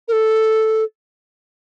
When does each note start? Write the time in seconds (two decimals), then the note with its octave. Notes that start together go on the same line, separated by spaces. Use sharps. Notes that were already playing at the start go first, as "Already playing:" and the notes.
0.08 A#4
0.13 A4